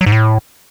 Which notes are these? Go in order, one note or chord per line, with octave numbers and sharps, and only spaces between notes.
F#3
G#2
A2